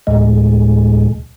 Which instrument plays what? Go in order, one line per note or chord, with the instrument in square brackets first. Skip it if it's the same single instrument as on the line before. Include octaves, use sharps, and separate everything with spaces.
[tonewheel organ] D2 A2 G#3